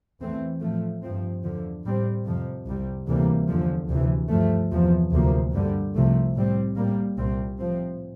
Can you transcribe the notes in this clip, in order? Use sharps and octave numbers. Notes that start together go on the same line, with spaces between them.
E2 E3 A3 C4
A2 F3 A3
G2 F3 C4
E2 D3 F3
A2 G3 C4
F2 C3 F3
C2 C3 G3
D2 C3 E3 G3 A#3
E2 D3 F3
D2 C3 E3
G2 F3 A3
E2 C3 F3
D2 C3 F3 A#3
G2 D3 G3
C2 C3 F3 A3
A2 G3 C4
A2 G3 A#3
C2 A#2 G3 C4
A2 F3 C4